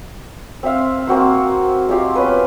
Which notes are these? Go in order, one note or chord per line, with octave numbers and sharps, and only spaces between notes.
C4 C5 E5 F5
A#3 C4 F#4 C5
G#3 F4 G4 F5
B3 C#4 B4